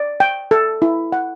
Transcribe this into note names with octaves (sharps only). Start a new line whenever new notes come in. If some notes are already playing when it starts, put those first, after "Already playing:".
Already playing: D5
G5
A4
E4
F#5